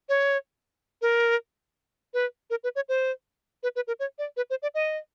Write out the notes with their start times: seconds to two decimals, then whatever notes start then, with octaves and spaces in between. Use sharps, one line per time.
0.09 C#5
1.02 A#4
2.14 B4
2.50 A#4
2.64 B4
2.76 C#5
2.89 C5
3.63 B4
3.76 B4
3.87 A#4
4.00 C#5
4.19 D5
4.37 B4
4.50 C5
4.62 D5
4.75 D#5